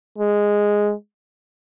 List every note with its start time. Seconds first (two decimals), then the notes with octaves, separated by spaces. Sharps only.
0.18 G#3